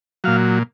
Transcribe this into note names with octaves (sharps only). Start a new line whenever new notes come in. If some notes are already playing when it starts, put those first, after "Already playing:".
A#2 F#3 F5